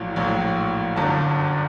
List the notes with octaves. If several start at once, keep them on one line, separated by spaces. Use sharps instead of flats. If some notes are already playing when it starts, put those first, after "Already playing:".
Already playing: A#1 A2 F#3
A#1 A2 F#3
G1 F#2 D3 F#3 A5